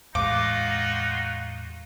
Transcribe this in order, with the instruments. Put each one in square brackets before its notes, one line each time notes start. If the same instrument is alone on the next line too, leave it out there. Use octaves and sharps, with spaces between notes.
[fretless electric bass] E2 A2 G#3 [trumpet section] D#4 F4 F#4 [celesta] F5 [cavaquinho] D6